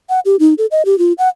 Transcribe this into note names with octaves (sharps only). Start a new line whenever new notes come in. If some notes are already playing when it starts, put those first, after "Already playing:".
F#5
G4
D#4
A4
D#5
G4
F4
F#5